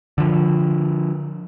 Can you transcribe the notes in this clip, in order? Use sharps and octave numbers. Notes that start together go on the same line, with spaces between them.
D3 F3